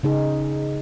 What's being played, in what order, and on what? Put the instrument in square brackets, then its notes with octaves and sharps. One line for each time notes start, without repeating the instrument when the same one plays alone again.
[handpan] C#3 D#4 G#4